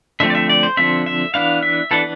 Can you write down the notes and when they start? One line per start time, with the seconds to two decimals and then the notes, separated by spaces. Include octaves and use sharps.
0.20 D3 F3 A3 C4 E5
0.30 D5
0.35 E5
0.49 D5
0.63 C5
0.77 D3 F3 A3 C4 E5
1.06 E5
1.34 E3 B3 D4 F5
1.63 E5
1.91 E3 B3 D4 A4